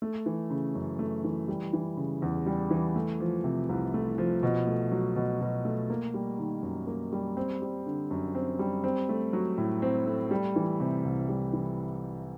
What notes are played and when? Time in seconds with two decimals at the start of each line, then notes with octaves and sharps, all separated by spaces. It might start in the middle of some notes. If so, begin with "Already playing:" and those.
0.02 A3
0.26 E3
0.50 C#3
0.75 F#2
0.99 A3
1.24 E3
1.48 G3
1.73 E3
1.97 C#3
2.22 E2
2.46 G3
2.71 E3
2.96 A3
3.20 F3
3.44 C3
3.69 C2
3.94 A3
4.18 F3
4.43 B2
4.67 A3
4.92 F#3
5.16 B2
5.41 B2
5.65 A3
5.90 A#3
6.14 G3
6.38 D#3
6.63 F#2
6.87 A#3
7.13 G3
7.37 C4
7.62 G3
7.86 D3
8.11 F#2
8.35 C4
8.59 G3
8.84 C4
9.09 A3
9.33 F#3
9.58 A2
9.82 C4
10.06 A3
10.31 G3
10.56 E3
10.80 C3
11.05 C2
11.29 G3
11.53 E3